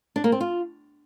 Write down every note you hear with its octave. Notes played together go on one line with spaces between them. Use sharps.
D4
A#3
C4
F4